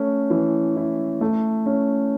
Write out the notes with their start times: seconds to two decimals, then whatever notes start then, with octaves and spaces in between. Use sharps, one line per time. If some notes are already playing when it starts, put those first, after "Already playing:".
Already playing: A3 C#4
0.30 E3
0.76 E4
1.21 A3
1.66 C#4